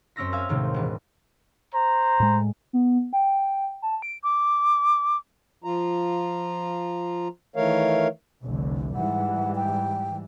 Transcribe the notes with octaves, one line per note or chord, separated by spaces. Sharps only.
F#2 C4 C#4 E6 A#6 B6
E5 F5 G#5 E6 F6
D#2 A2 C3 G#3 C4
E1 B4
C5 A#5
A2 G#3
B3
G5
A5
D7
D6
F3 F4 A#5
D#3 E3 A3 A#4 C#5 F5
F1 C2 D3
G#2 E3 G3 F#5
G5